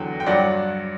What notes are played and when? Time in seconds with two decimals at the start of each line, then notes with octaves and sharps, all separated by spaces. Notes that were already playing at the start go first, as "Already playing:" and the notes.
Already playing: E2 D3 F#3 G5
0.20 G5
0.26 G2 F#3 D5 F#5